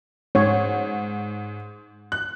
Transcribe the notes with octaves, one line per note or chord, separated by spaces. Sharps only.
G#2 C#5
F#6